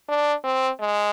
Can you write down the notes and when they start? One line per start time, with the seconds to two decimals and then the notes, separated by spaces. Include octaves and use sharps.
0.08 D4
0.44 C4
0.80 G#3